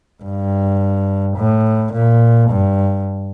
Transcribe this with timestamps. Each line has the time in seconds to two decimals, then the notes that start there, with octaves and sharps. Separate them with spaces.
0.23 G2
1.37 A2
1.93 A#2
2.50 G2